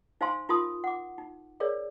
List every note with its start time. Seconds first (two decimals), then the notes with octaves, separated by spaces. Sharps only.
0.21 D#4 C5 F5 G#5 A5 C6
0.49 D#4 F4 A#4 A5 C6 D#6
0.84 F#5 D6
1.18 D#4
1.60 G#4 A#4 C#5 D5